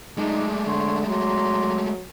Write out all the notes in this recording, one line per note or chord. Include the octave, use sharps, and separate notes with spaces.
G#3 A3 D4 D#4
D3 C#5 C6
F#3 D5 A#5 C6